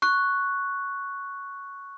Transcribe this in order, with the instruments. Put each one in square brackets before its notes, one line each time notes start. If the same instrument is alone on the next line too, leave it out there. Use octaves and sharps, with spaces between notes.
[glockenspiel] C#6 F#6